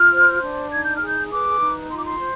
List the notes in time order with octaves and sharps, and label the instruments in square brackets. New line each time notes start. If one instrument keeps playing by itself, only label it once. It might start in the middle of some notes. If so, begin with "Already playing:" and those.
Already playing: [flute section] F4 F6
C5
D4
D#4 G#6
G6
F6
G#4
G6
B4 D6
D#4
F4 C6
D6
C6
C5